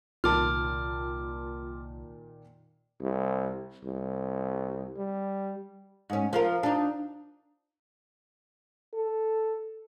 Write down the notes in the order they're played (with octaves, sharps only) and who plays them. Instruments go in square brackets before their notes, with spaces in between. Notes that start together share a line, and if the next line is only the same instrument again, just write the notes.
[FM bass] C2 [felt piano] A#2 D#3 A5 [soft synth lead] F4 [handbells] D6 F6
[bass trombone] C2
C2
G3
[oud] G#2 C#4
F3 F4 A#4
D4 D#4
[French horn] A4